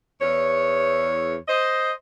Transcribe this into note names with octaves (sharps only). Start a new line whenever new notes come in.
E2 C#5
C5 D#5